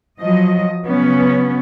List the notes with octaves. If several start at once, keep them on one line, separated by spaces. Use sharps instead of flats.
F3 F#3 D#5
C#3 F#3 B3 C#4